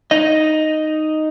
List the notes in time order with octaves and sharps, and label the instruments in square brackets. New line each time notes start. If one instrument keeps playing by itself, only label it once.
[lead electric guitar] D#4 D#5